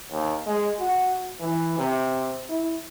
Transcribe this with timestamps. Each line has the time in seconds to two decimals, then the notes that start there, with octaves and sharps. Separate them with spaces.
0.12 D#2
0.46 G#3
0.80 F#4
1.40 E3
1.78 C3
2.49 E4